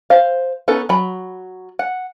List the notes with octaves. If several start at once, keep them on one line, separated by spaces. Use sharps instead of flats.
C5 F5
B3 C#4 D#4 A4
F#3 B5
F#5